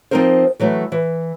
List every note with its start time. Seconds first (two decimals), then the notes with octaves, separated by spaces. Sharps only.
0.11 F3 B3 C4 D#4 A#4 C5
0.60 E3 F#3 A3 E4
0.92 E3